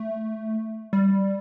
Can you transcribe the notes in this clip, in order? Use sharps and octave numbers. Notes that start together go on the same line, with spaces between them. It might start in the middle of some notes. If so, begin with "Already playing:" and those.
Already playing: A3
G3